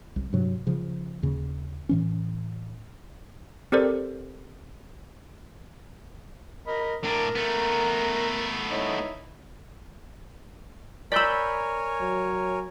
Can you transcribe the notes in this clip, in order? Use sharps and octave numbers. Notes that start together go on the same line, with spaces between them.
C2
G2 C3 F#3
C#3 F3
D#2 C#3
A2 E3 C#4
C4 G4 A4 A#4 C5 D5
A#4 D#5 B5
A2 D4 A#4 A#5
A3 B3
D#4 E4 C#5
A#4 C#5 D5 G#5 B5 E6 G6 B6
F#3